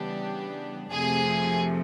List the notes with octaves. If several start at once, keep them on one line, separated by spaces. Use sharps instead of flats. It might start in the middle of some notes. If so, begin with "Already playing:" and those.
Already playing: C#3 E3 G3 B3 D4 G4
F2 C3 F3 A3 G#4